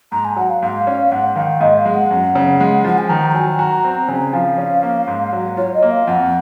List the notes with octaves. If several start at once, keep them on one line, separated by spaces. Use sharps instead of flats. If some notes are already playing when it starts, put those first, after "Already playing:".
G#2 A#5
G#5
F#3 F#5
F5
G#2 F5
C#4
G#2 F#5
D#3 F5
G#2 D#5
F5
G#3
F#5
F#2
C#3
G#3
F3 F#5
G#5
D#3 A#5
A#5
F#3 G#5
F#4 A#5
C4
C#3 G#5
F3 F5
C#4
A#3
G#2
F#3
F4 C#5
D#5
A#3
F5
F2 F#5